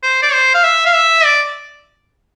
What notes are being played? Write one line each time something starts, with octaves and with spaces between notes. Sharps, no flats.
C5
D5
C5
F5
E5
F5
E5
D5